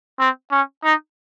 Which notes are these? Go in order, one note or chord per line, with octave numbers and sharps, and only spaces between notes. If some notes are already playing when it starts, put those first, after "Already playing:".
C4
C#4
D#4